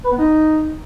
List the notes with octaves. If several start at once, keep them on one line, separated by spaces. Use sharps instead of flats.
B4
B3
D#4